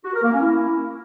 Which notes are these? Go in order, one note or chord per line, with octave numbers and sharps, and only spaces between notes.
F#4
A#4
A#3
C#4
E4